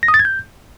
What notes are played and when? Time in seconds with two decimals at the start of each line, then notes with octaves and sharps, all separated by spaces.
0.03 A#6
0.08 D#6
0.14 A6
0.19 G#6
0.25 G6